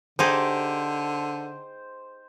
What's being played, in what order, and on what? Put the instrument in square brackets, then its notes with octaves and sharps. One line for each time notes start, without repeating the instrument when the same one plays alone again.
[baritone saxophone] D3 [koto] D#4 G4 G#4 [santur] C5